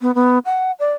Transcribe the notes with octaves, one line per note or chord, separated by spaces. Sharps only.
B3
B3
F#5
D5